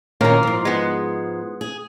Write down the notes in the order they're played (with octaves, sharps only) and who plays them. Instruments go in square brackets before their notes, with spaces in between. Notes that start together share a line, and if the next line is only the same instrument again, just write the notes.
[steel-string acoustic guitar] A#2 D#3 C#4 [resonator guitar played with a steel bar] A#3 A#4
[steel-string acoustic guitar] G#2 F3
[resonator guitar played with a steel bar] G#3 B3
[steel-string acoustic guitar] G#4